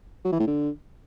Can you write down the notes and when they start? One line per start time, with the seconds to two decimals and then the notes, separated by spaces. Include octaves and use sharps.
0.24 F#3
0.32 E3
0.40 A2
0.47 D3